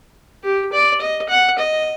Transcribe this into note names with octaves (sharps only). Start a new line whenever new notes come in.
G4
D5
D#5
F#5
D#5